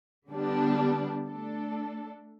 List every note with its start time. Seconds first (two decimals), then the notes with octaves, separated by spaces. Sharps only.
0.30 D3 G3 B3 D4
1.28 A3 D4 A4